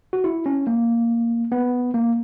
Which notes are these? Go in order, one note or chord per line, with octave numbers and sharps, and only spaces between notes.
F#4
E4
C#4
A#3
B3
A#3